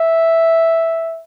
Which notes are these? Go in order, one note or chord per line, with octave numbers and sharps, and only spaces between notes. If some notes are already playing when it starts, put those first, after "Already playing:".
Already playing: E5